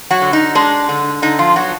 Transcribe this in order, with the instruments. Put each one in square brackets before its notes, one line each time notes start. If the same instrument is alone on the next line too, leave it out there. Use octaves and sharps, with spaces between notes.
[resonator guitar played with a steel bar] F#3 F#4
D3
D#4
G#3 D4
D3
D3 D#4
F3 F4
F#3 B3 F#4